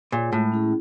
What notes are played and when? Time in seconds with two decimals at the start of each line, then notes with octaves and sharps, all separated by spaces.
0.12 A#2 F4 G#4 C#5
0.32 A2 G#3
0.52 C#4 E4 G#4